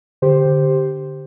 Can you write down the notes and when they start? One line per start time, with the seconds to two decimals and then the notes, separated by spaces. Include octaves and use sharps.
0.22 D3 G4 C5
0.45 D3